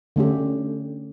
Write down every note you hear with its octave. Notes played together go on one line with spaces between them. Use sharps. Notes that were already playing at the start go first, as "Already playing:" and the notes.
D3 A3 C#4 G4